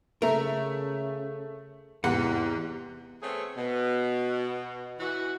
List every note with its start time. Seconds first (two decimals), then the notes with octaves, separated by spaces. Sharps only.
0.22 C#3 A3 A#4 E5
2.04 E2 G#2 C3 F#5
3.22 A3 B3 C4 G#4 C#5
3.57 B2
4.99 E3 F#4